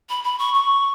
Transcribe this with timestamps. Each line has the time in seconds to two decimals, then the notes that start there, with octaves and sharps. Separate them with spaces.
0.09 B5
0.24 B5
0.39 C#6
0.54 C#6